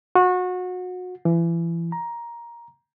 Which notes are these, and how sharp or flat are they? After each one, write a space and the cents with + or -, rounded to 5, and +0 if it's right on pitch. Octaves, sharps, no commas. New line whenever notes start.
F#4 -25
E3 +30
A#5 +10